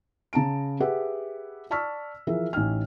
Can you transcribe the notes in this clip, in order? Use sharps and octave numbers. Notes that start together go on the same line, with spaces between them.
C#3 A5 A#5 D7
G4 G#4 B4 E5 F#5
D5 A5 C#6 E6 F6 B6
E3 F3 G#4 A#4 E5
A1 D#4 G#5 F6